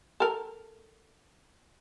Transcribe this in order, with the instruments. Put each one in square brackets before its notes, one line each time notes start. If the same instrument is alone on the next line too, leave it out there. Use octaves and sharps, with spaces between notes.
[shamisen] A4 A#4